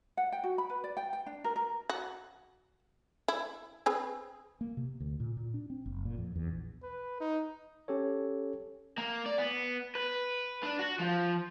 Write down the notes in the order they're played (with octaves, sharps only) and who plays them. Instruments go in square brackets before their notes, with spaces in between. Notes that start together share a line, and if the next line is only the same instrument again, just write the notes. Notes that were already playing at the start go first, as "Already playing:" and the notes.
[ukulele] F#5
G5
F#4
B5
B4
D5
G5
G5
D4
A#4
A#4
[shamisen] F#4
E4
C4 G#4 B4
[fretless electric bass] A#3
C3
D2
A#2
A#2
D4
C4
F#1
A#2
F2
E2
A#1
[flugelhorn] B4
D#4
[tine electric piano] C#4 G4 A4 C#5
[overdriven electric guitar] A#3
D5
B3
B4
D4
F#4
F3